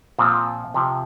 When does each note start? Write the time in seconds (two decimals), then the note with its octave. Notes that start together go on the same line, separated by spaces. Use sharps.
0.19 A#2 F3 C4
0.74 C3 F3